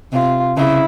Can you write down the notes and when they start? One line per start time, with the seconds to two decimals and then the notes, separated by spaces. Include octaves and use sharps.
0.13 C3 F4
0.57 C#3 E4